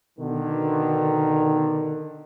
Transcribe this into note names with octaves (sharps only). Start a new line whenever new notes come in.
B2 D3 D#3